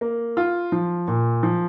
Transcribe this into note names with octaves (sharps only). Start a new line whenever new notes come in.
A#3
F4
F3
A#2
F3